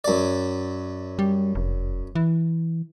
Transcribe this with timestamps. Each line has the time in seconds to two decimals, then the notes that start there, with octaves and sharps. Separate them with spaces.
0.04 F#2 D5
1.19 G3
1.55 F1
2.15 E3